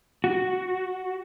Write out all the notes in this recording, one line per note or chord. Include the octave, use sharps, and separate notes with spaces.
F#4